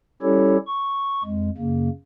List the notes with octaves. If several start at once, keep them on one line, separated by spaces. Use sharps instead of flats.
G3 C#4 E4 G4 A4 C#5
C#6
F2 G#3
F#2 C#3 A#3